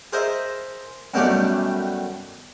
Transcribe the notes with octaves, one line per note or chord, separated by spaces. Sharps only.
G#4 A#4 C5 D#5 E5
F#2 B2 D#3 G3 A3 D4